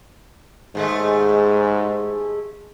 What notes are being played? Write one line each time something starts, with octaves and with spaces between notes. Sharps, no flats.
D#2 G#2 G#3 A3